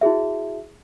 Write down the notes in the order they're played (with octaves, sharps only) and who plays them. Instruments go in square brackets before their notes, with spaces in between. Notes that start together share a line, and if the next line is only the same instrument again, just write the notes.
[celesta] E4 F#4 G#4 E5